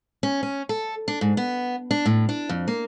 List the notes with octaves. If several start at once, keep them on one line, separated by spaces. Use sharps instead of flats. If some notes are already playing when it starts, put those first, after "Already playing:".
C#4
C#4
A4
D4
G#2
B3
D4
A2
D4
F2
A#3